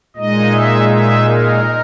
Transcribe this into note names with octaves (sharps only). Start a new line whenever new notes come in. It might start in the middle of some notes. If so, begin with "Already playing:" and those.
A#2 G#3 D#4 D#5
E5
E5
A#4